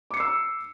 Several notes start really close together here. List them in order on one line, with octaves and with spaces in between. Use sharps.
D6 C#7 C7 E6